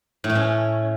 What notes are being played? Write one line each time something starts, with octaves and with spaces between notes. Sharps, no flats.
A2
A3
C#4